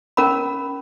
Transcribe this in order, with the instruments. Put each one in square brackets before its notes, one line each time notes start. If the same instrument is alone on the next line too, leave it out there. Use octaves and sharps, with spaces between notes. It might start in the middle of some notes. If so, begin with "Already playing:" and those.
[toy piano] C#4 A#4 F5 A#5 B5